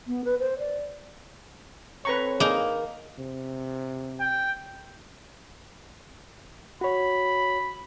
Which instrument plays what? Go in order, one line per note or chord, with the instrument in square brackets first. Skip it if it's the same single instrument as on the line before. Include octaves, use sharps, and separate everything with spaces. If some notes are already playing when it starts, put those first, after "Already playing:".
[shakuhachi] B3
B4
C5
D5
[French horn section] C4 A4 C#5 [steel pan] B4 A#5 C#6
[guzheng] A#3 D#4 [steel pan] G#4
[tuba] C3
[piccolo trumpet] G5
[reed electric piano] F#4 C#5 [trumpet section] B5